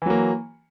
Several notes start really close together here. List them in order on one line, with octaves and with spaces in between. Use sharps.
E3 F#3 A#3